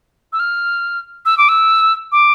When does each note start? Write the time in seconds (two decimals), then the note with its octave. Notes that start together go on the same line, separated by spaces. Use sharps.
0.33 E6
0.40 F6
1.26 E6
1.38 D6
1.49 E6
2.12 D6